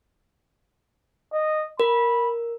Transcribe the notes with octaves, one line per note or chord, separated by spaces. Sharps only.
D#5
A#4 B5